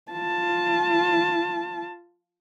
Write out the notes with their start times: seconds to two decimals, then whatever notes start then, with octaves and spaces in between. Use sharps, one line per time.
0.12 F4 A5